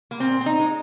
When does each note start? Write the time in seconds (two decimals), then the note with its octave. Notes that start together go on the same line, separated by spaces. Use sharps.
0.11 A#3
0.20 A#2 C4
0.41 C4
0.46 D#4
0.59 G#3